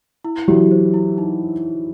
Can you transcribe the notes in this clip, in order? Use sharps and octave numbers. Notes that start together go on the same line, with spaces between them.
E4
E3 F#3 G4
C5
E4
D#4